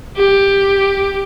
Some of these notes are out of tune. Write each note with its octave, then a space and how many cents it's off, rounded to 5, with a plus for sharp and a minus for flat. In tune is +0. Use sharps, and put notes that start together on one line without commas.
G4 +10